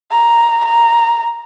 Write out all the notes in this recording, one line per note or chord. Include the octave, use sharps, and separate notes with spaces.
A#5
A#5